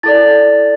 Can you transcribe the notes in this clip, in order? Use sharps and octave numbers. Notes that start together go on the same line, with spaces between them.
E4 A4 D5 A6